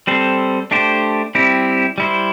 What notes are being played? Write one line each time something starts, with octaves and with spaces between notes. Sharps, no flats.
G3 C4 A4 C5
A3 D4 G4 C5
G3 C4 E4 G4
G3 E4 C5